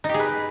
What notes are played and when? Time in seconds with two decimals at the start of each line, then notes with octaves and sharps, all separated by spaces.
0.04 D#4
0.09 G4
0.14 G#4
0.19 B4